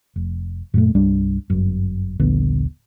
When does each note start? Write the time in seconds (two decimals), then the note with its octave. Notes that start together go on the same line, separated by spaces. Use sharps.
0.16 F1
0.74 F#2 A#2 A3
0.95 C2 G2 G3 D4
1.50 G1 F#2
2.20 D#1 A#1 D3 B3